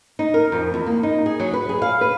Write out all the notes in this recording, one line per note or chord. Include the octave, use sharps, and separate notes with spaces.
D#4
A#4
F2
E2
A#3
D#4
G#4
F#3
B4
G#4
F5
B4